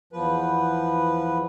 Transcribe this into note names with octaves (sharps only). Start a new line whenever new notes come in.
E2 F3 B4